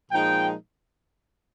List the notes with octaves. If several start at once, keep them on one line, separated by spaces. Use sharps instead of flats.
A#2 F3 G#3 D#4 G5